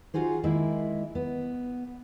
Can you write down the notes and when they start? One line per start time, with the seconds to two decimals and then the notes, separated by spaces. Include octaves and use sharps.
0.14 D#4 F4 F#4 G#4 C5
0.43 D#3 G#3 A#3 E4
1.15 B3